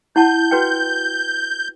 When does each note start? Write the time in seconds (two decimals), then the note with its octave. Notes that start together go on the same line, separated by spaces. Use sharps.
0.16 E4 F#5 A5 G6
0.51 F#4 B4 G5